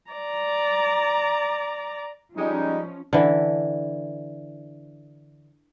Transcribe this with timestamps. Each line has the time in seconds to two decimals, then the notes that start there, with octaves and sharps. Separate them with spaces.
0.11 D5 A#5
2.37 F3 G3 G#3 C#4 D#4
3.13 D3 E3